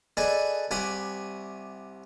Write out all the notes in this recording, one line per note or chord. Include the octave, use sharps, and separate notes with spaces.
G#4 A4 B4 D5 D#5 G#5
C2 G4 F#5 G#5 B5 D#6